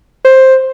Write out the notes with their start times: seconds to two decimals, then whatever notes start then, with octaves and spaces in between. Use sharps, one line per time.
0.25 C5